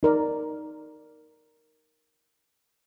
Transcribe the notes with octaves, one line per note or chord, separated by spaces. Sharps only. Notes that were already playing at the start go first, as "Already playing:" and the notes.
D#4 A#4 D5